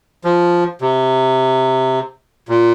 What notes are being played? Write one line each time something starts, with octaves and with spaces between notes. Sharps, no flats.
F3
C3
A#2